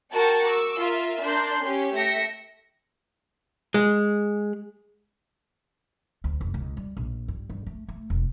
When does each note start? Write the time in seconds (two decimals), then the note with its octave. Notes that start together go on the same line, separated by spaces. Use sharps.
0.13 F#4 A#4 G5 A5 A6 C#7
0.48 C#6 D6 E6
0.80 F4 A#4 E5
1.23 D4 A#4 C6 G6
1.64 C#4 G4 C#5
1.95 A3 E5 G5 A#6 C#7
3.74 G#3
6.24 D2
6.41 F1
6.54 C#2
6.77 G3
6.97 A#1
7.28 G2
7.50 G2
7.67 A3
7.88 A3
8.10 E1